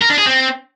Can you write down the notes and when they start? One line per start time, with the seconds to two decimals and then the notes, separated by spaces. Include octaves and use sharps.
0.02 A#4
0.10 D4
0.18 G#4
0.26 C4